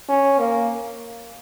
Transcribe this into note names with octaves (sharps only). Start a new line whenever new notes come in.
C#4
A#3